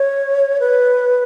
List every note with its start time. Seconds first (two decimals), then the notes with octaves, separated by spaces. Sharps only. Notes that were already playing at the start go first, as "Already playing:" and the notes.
Already playing: C#5
0.60 B4